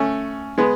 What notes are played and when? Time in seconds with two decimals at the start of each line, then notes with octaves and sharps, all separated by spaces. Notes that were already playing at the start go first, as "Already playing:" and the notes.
Already playing: A3 C#4
0.58 G#3 B3